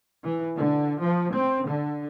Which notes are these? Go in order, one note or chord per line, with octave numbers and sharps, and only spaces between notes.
E3
D3
F3
C4
D3